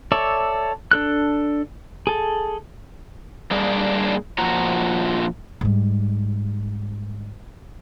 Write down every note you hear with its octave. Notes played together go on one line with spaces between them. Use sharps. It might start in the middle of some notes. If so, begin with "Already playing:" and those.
A4 C#5 D5 E5
D4 A4 F#6
G#4 A4
G3 A#3 D4 G#4
A#2 F3 F#4 A#5
G#2 G3